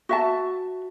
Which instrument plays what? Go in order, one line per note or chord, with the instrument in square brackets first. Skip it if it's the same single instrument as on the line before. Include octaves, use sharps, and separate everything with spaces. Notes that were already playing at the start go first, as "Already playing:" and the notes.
[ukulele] F#4 E5 A5